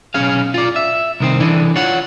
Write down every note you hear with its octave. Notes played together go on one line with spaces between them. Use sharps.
B1 C#4 G#4 F5
F4 D5
E5
C2 D#3 C4
D3 E3 D4
F4 C#5 F#5